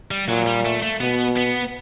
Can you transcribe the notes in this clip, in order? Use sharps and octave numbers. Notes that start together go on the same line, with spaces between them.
G3
A#2 F#3
G3
A3
A3
B2 B3
B3